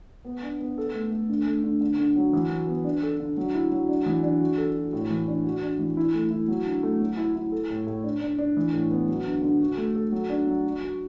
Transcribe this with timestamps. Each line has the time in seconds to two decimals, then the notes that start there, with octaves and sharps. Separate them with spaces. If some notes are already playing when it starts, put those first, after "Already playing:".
0.25 B3
0.43 D4
0.60 B3
0.78 A4
0.95 A3
1.11 A3
1.29 D3
1.46 A3
1.64 D3
1.81 D3
1.98 D3
2.16 F#3
2.33 E3
2.51 F#4
2.67 B3
2.84 D4
3.03 A4
3.20 D3
3.37 F#3
3.54 E4
3.72 F#3
3.89 D4
4.06 E3
4.23 D4
4.40 F#4
4.57 A4
4.76 F#4
4.93 A2
5.11 E3
5.28 D4
5.44 F#4
5.62 D4
5.79 E3
5.97 E4
6.14 A3
6.31 E4
6.48 F#3
6.66 D3
6.83 A3
7.00 F#3
7.17 E4
7.36 E4
7.52 A4
7.70 A2
7.87 A2
8.04 D4
8.21 D4
8.38 D4
8.57 E3
8.74 A2
8.91 B3
9.08 F#3
9.26 D3
9.42 D3
9.61 F#4
9.77 A3
9.95 A4
10.12 F#3
10.29 D4
10.46 F#3
10.64 F#4
10.81 F#4